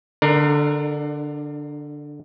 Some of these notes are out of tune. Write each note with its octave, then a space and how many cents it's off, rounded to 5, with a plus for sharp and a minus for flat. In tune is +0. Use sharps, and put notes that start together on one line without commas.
D3 +0 D4 +35 A#4 +0